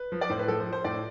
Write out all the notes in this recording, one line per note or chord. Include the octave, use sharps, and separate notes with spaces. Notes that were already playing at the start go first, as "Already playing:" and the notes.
Already playing: B4
F3
D5
A2 C5
B4
F3 A4
C5
F3
C5
A2 D5